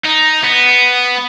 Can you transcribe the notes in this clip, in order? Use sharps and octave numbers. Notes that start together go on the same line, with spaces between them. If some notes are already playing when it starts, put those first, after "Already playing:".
D#4
B3